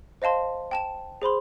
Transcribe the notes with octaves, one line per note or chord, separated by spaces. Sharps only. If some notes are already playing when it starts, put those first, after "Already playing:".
C5 D#5 F5 A5 C6
G5 A5 E7
G#4 C5 B5 C6